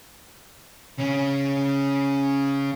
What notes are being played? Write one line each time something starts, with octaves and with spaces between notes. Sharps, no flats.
C#3 C#4